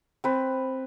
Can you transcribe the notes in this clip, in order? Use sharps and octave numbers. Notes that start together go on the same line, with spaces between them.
C4 B4